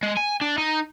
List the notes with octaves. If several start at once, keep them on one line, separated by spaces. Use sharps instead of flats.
G#3
G#5
D4
D#4